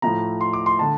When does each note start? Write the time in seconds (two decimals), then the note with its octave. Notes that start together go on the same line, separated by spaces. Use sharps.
0.02 A2 F3 A3 A#5
0.41 C6
0.53 D6
0.66 C6
0.79 D3 A3 A5